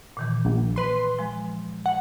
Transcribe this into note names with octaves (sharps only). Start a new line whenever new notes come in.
A#2 D#3 E3
A#1
B4 C6
F3 G#3
F#5